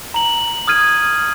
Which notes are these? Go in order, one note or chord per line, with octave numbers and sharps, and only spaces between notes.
A#5 F#7
D#6 F6 G#6 D#7